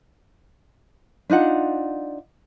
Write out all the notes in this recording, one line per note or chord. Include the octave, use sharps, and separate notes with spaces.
D4 D#4 F4 F#5